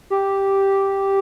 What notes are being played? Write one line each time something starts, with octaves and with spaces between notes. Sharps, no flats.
G4